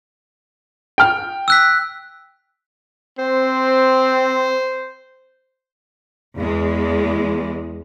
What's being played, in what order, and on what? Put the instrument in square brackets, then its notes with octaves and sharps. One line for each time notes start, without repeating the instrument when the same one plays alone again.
[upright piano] G5 F6
[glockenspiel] E6 F#6 B6
[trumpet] C4 [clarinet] C5
[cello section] E2 G#3